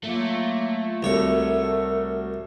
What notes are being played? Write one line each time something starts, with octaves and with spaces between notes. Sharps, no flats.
F#3 A3 A#3 F4
C2 F#4 A4 A#4 C#5